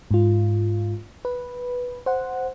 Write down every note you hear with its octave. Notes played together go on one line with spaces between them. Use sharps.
G#2 F4
B4
C5 F#5